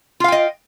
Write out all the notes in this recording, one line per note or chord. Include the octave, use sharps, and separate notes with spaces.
F4 D#5 F5 G5